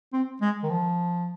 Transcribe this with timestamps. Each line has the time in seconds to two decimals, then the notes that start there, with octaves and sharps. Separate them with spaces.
0.13 C4
0.41 G#3
0.63 D#3
0.70 F3